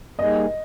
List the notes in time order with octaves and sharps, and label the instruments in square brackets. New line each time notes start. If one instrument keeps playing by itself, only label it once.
[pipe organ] G3 A#3 D#4 G#4 [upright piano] D#5